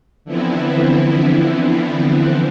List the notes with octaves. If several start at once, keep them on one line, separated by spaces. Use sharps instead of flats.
D3 E3 F3 B3 C4 E4